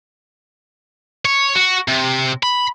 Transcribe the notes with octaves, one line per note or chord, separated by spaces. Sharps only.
C#5
F#4
C3
B5